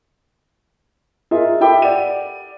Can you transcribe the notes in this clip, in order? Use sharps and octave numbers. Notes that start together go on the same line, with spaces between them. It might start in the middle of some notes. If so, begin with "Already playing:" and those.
F4 G#4 A#4 D#5 E5
G4 A4 E5 G5 B5 D6
D5 F#5 D#7